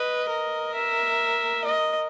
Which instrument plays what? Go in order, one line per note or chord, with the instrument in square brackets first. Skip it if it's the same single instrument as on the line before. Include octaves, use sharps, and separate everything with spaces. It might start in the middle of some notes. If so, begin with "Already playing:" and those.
Already playing: [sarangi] B4 [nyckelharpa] D#5
[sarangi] A#4
[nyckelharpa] E5
D#5